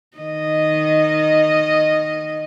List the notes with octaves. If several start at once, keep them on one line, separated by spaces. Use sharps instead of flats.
D#3 D#5